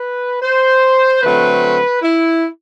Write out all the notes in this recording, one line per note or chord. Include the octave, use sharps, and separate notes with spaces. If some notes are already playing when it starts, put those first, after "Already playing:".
Already playing: B4
C5
D3 F#3 A3 C4 B4
E4